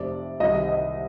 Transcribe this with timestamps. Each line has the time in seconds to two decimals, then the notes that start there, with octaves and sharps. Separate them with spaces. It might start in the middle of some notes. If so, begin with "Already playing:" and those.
Already playing: F1 F2 C3 D5
0.40 C2 C3 D#3 D#5
0.69 D#5